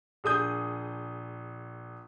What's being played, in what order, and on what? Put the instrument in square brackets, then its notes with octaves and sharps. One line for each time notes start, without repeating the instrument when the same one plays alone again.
[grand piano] A#1 G#4 D#6 G6